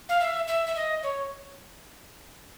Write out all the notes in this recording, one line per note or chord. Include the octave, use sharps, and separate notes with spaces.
F5
E5
E5
E5
D#5
C#5